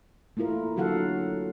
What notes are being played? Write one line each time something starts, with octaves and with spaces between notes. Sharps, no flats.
A3 A#3 E4 F4 A#4
D3 F#3 F#4 A4 F5 F#5